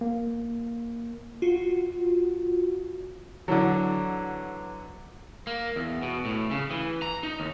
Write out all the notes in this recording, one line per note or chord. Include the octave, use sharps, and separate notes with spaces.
A#3
F4 F#4
D3 E3 F#3
A#3
E2
B2
A2
C#3
E3
A#5
D#4
D#2